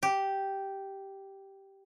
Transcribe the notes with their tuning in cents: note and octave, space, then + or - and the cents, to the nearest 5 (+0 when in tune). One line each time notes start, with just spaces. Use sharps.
G4 -5